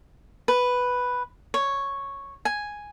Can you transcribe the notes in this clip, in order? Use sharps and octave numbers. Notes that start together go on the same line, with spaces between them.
B4
C#5
G#5